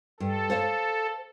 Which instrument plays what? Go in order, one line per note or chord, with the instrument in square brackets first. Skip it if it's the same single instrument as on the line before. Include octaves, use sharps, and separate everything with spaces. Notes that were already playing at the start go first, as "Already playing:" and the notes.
[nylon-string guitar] G2 [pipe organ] A4
[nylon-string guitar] C5 C#5 F5